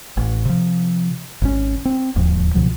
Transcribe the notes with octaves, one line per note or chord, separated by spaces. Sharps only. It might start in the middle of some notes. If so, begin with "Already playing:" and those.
A1
C3 F3
G#1 G#2 C3 C#4
C4
D1 D#2 G#2 F3
C#2 B2 F3 F#3